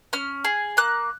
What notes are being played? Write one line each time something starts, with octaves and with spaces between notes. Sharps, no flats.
C#4 F6
G#4
A#3 F#6